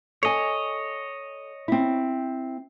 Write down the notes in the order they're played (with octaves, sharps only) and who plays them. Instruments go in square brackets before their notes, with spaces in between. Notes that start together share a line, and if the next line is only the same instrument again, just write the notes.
[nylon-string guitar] A4 G#5 [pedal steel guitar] C#5 D#5
[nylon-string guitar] C4 E4